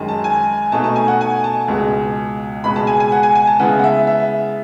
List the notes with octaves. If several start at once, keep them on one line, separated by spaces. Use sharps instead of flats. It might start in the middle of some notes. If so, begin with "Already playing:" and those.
Already playing: F#2 D#3 G#3 D#4
A5
G#5
B2 A3 D#4 A5
A5
G#5
F#5
G#5
A5
C#2 B2 G#3
C#2 B2 G#3 B5
A5
G#5
G#5
F#5
G#5
G#5
A5
C#3 G#3 B3 E4 F#5
F#5
E5
E5